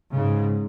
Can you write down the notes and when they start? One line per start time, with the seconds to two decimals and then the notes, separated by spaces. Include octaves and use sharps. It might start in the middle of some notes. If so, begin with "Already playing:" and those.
0.13 G#2 C#3